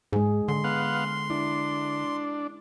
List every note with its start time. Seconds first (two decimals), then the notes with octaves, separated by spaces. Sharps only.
0.13 G#2 G#3 G#4
0.48 D3 C6
0.64 B3 F5 F#5
1.30 D4 E4